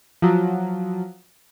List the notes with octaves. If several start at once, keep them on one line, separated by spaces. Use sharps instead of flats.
F3 F#3